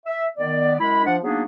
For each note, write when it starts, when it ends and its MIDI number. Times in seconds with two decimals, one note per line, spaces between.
0.06 0.25 76
0.37 0.73 51
0.37 0.73 59
0.37 0.73 74
0.79 1.02 42
0.79 1.02 56
0.79 1.02 64
0.79 1.02 83
1.05 1.16 53
1.05 1.16 62
1.05 1.16 78
1.23 1.43 54
1.23 1.43 58
1.23 1.43 59
1.23 1.43 62
1.23 1.43 63
1.23 1.43 68